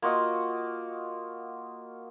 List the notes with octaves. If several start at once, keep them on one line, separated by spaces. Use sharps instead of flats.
A#3 F4 F#4 D#5